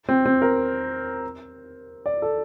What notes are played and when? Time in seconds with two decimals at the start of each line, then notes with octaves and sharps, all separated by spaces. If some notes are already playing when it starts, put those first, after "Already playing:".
0.09 C4
0.25 C4
0.42 A#4
2.06 D5
2.22 A4